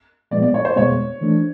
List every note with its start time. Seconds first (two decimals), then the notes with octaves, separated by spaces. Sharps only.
0.31 A#2 F3 G#3 B3 D5
0.42 D5
0.54 C#5
0.65 C5
0.76 E2 B2 G#3 B3 C#5
1.21 E3 A3 D4